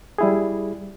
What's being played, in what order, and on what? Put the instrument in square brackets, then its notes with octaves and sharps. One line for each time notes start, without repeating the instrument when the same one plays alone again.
[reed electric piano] G3 E4 G#4